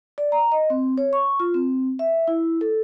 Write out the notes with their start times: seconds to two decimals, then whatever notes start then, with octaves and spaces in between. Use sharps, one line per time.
0.18 D5
0.32 A#5
0.52 D#5
0.70 C4
0.98 C#5
1.13 C#6
1.40 F4
1.54 C4
1.99 E5
2.28 E4
2.61 A4